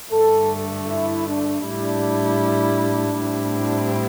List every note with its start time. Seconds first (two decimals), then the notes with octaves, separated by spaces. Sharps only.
0.12 G2 D3 A3 A4
0.89 E4
1.28 D4
1.65 A2 G3 D4 E4
3.20 A2 G3 C4 E4